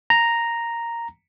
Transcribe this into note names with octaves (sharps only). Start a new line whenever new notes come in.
A#5